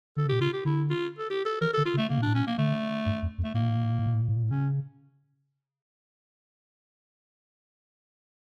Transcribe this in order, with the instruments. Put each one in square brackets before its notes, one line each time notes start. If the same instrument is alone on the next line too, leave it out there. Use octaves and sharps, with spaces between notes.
[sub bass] D3 [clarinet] A4
[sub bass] C#3
[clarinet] G4
[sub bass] A#2
[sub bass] C#3 [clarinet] F4
[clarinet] G4
[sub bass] D3 [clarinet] E4
[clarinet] F4
A4
G4
A4
[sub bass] E3 [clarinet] A#4
[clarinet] A4
[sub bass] D3
[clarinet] F4
[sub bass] C#3
[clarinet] A3
[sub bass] C#3 [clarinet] A#3
[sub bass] A#2
[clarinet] D4
[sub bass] A2
[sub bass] A#2 [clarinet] C#4
[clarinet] A#3
[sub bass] D3 [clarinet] A3
[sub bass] G2
F2
F2
[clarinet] A3
[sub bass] A2 [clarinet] A#3
[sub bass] A#2
A2
A#2
A2
A#2
A2
A#2
A2
A#2
A2
A#2
A2
[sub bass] C#3 [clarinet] C#4